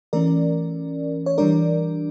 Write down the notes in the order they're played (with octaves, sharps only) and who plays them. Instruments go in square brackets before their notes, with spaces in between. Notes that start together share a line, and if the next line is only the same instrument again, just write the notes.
[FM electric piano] E3 A3 C#4 A#4 D5
C#5
E3 G3 D4 A#4 D5